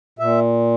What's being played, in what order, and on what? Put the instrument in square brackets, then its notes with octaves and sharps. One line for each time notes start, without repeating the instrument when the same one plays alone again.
[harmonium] A#2 E5